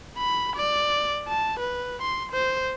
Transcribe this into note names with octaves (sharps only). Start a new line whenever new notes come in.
B5
D5
A5
B4
C6
C5